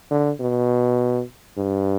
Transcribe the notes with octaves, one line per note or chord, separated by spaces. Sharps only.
D3
B2
G2